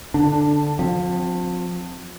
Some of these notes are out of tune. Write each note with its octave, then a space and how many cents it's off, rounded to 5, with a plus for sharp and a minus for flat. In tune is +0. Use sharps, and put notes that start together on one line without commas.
D3 +0 D4 +15
F3 +35 C4 +0